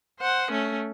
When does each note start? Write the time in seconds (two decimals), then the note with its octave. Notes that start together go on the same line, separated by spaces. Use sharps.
0.20 C5 F#5
0.51 A3 C#4